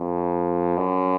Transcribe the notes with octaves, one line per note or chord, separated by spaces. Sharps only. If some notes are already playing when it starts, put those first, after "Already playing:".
Already playing: F2
F#2